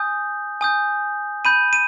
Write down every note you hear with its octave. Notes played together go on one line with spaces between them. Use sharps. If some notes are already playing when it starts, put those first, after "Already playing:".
Already playing: G#5 D#6 G6
G#5 D#6 G6
B5 G6 D#7
D#7